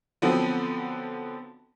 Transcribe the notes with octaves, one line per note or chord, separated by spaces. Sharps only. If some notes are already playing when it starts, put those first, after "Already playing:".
D3 F3 F#3 B3 C4